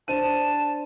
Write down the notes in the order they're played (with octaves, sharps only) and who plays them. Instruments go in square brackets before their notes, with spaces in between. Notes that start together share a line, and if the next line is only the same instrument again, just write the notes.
[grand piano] D4 C5 D#7 [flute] A5